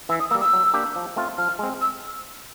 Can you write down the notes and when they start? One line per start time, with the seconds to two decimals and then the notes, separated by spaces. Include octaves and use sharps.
0.09 E3 E6
0.20 D#6
0.30 G3 A#3 E6
0.41 E6
0.53 F#3
0.74 A#3 D4 G4
0.96 F3
1.16 A3 C4 F4
1.38 F3 F6
1.59 G#3 C4
1.81 E6